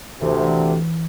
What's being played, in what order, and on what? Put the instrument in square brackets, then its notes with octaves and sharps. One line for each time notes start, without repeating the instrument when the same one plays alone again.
[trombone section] D2 C3 [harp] E3